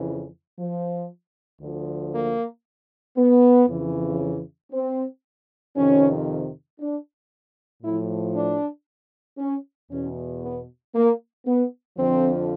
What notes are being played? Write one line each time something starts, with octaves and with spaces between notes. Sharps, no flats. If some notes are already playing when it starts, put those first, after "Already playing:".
Already playing: F2 C#3 E3
F3
D2 D3 F3
A#3
B3
F2 C#3 E3
C4
F2 C3 D#3 C#4
D4
A2 F3 E4
D4
C#4
E2 B2 C#4
B3
A#3
B3
F2 D3 F3 C4